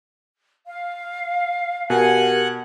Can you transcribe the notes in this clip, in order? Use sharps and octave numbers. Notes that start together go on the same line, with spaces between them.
F5
B2 G4 A#4 F#5 G#5 F#6